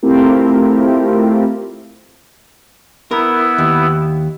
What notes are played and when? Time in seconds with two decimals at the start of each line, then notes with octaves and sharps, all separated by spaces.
0.03 A3 C4 E4 F4 G4 A#4
3.11 B3 E4 A#4
3.58 D#2